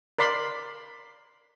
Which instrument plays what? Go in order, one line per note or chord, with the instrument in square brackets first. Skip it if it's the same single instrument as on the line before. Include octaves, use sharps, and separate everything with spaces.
[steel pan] A#4 D5 B5 C6